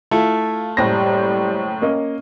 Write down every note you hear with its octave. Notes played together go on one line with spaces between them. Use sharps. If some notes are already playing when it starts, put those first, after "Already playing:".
A3 E4 F4
F#1 A2 G3 C5 A#6
A#3 C#4 D#5